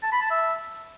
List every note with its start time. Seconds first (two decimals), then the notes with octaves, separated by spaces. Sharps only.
0.03 A5
0.13 B5
0.22 A5
0.31 E5